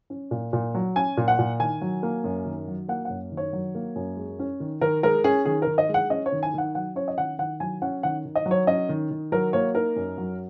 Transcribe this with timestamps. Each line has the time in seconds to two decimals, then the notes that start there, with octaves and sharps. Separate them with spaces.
0.10 C#4
0.31 A#2
0.53 A#2
0.74 F#3
0.96 C#4 G#5
1.17 A#2
1.28 F#5
1.39 A#2
1.60 D#3 G#5
1.81 F#3
2.03 A#3
2.24 F#2
2.45 D#3
2.68 F#3
2.88 A#3 F#5
3.05 F#2 F#5
3.32 D#3
3.37 C#5
3.53 F#3
3.75 A#3
3.96 F#2
4.17 G#3
4.39 C#4
4.60 D#3
4.81 D#3 A#4
5.03 G#3 A#4
5.24 C#4 G#4
5.45 D#3 G#4
5.62 D#3 A#4
5.78 D#5
5.89 G#3
5.94 F#5
6.10 C#4 D#5
6.26 C#5
6.32 D#3
6.43 G#5
6.54 D#3 F#5
6.75 F#3 F#5
6.96 C#4 C#5
7.08 D#5
7.18 D#3 F#5
7.39 D#3 F#5
7.60 F#3 G#5
7.82 C#4 F#5
8.03 D#3 F#5
8.25 D#3
8.35 D#5
8.46 F#3
8.51 C#5
8.67 C#4 D#5
8.89 D#3
9.11 D#3
9.32 F#3 A#4
9.53 A#3 C#5
9.75 D#4 A#4
9.96 F#2
10.18 F#3